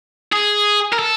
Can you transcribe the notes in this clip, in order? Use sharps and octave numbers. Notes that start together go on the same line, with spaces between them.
G#4
A#4
A4